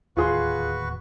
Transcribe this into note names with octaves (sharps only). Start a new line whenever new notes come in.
D1 D#2 F4 F#4 G#4 B4 C6 C#6